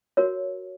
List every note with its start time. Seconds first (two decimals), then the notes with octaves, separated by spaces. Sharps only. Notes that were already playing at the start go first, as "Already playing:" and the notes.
0.17 F#4 A#4 C#5